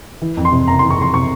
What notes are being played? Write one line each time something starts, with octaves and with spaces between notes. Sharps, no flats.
E3
F2
C6
C3
F#1 A#5
E3 C6
C#6
F2 C6
C3 C#6